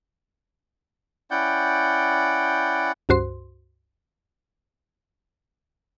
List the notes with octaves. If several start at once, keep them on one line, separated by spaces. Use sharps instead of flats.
C#4 E4 D5 F#5 G5 G6
C#2 G2 F#4 C5 C6